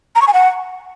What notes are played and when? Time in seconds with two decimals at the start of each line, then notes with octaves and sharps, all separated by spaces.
0.15 A#5
0.22 C#6
0.28 G#5
0.34 F#5